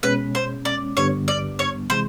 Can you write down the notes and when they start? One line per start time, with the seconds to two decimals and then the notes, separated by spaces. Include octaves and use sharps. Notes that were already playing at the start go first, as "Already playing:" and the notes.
0.03 B2 G#3 C#4 B4
0.35 C5
0.65 D5
0.97 G2 D3 G3 B3 C#5
1.28 D5
1.59 C#5
1.90 C3 E3 G#3 C5